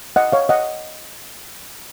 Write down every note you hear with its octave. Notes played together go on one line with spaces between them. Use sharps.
D#5 F#5
C#5 F5
D#5 F#5